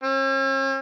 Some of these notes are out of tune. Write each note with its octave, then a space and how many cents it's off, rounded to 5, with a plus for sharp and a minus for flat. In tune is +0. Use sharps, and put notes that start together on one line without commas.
C#4 -45